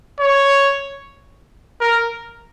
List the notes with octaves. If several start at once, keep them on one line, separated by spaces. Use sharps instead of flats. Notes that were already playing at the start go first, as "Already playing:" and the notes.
C#5
A#4